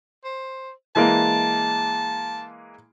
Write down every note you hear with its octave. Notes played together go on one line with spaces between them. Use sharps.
C5
E3 G#3 A#3 A5